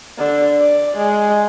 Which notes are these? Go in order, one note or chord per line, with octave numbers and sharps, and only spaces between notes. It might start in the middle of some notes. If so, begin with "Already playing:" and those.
D3
D5
G#3